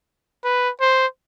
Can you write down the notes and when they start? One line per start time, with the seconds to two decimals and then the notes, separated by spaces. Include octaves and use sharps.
0.44 B4
0.81 C5